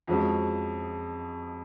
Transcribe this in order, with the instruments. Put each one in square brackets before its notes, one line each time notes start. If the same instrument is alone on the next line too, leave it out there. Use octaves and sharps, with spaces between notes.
[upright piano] F2 F3 G#3 C#4 F#4